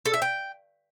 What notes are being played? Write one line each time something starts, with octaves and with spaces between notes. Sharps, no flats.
A4
E5
G5